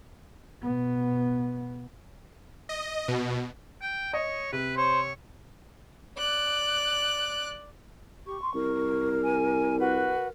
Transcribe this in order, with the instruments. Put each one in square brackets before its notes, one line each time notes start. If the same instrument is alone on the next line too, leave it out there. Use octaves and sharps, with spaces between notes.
[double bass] B2 B3
[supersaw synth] D#5
B2
[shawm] G5
[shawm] C#5 [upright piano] D#5
[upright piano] C3 [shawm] B4
[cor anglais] C5 [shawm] C#5
[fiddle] D5 F#6
[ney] G4 [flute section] C#6
[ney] C6
[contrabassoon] C2 [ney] A#4
[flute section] G#5
F#4 B4